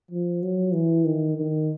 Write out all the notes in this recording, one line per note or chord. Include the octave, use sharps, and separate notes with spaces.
F3
F#3
E3
D#3
D#3